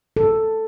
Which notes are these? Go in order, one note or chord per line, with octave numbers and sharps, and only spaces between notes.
A4